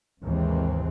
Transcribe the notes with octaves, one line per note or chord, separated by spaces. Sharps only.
G#1 D#2 C3 E3 G#3 C4